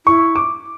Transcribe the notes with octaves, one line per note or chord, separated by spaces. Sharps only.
E4 C#6
D6